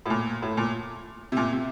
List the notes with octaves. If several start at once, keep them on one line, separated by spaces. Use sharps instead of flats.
A2
A#2
A2
A#2
C3
A#2
C3